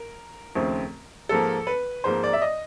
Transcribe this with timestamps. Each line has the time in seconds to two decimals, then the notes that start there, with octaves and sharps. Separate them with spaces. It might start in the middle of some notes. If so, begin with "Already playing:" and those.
Already playing: A#4
0.55 D#2 C#3 F3 A3 C4
1.29 G#2 F3 A#3 A4
1.67 B4
2.04 G#2 F3 A#3 C5
2.24 D5
2.33 E5
2.42 D#5